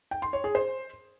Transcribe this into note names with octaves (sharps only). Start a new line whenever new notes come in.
G5
C6
C#5
G#4
C5